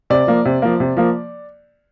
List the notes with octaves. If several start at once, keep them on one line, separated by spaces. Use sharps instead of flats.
C3 D5
F3 A#3
C3
F3 A#3
C3
F3 A#3